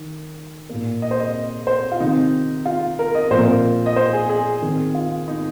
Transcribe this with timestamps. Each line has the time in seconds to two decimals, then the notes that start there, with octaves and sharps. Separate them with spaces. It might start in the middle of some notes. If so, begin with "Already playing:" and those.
Already playing: D#3
0.69 A#2 A#3
1.02 D#5
1.11 C5
1.20 D#5
1.67 C5
1.92 F4
2.00 C3 D#3 C4 D#4
2.66 F4
2.99 A#4
3.15 D#5
3.31 A#2 F3 C4 C5
3.39 A#4
3.46 C5
3.86 D#5
3.96 C5
4.13 G#4
4.29 G#4
4.62 D#3 C4
4.95 F4
5.28 D#4